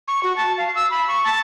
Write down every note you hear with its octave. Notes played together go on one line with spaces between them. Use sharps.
C#6
F#4
A5
F5
E6
B5
C#6
A5